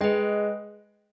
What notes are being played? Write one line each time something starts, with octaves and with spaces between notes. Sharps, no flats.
G#3 G#4 B4 D#5 G5